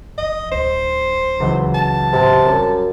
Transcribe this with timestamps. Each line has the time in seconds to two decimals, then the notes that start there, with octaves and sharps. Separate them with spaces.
0.18 F1 D#5
0.52 D1 D4 C5
1.40 C#2 E3 F#3
1.74 A5
2.13 A2 C3
2.46 F#2 G3